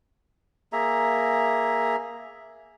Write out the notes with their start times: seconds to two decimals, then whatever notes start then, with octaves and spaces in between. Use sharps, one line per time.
0.73 A#3 G#4 E5 A#5